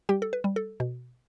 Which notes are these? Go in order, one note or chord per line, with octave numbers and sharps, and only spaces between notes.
G3 G4 G5
A4
B4
G3
A4
B2